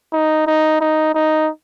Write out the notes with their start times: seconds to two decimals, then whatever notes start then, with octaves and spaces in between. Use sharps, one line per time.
0.13 D#4
0.47 D#4
0.81 D#4
1.15 D#4